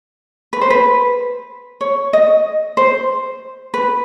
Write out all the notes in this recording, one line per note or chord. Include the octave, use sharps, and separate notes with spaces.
B4
C5
B4
C#5
D#5
C5
B4